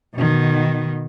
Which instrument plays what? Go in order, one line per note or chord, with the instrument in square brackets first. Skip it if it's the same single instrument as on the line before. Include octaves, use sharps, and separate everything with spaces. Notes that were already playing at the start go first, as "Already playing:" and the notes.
[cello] B2 D#3